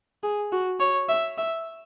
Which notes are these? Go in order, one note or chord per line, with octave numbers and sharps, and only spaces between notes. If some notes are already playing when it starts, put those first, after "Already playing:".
G#4
F#4
C#5
E5
E5